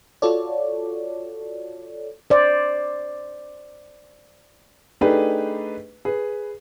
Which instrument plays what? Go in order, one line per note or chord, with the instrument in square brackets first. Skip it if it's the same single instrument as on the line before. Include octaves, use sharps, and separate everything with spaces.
[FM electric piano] F4 F#4 A4 C#5 D5
[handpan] C5 D5
[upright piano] A3 D4 D#4 G4 G#4 B4
G#4 B4